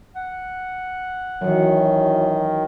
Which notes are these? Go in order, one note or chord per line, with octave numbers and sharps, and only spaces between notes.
F#5
F#2 D#3 E3 F#3